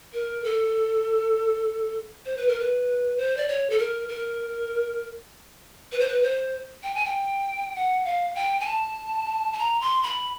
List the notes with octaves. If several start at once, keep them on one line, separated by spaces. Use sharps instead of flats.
A#4
A4
C5
B4
A#4
B4
C5
D5
C#5
A4
A#4
A#4
B4
C5
B4
C5
G5
G#5
G5
F#5
F5
G5
G#5
A5
A5
A#5
C6
B5